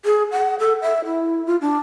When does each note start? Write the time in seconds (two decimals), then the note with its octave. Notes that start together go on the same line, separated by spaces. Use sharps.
0.05 G#4
0.32 F#5
0.59 A4
0.82 E5
1.05 E4
1.46 F4
1.61 D4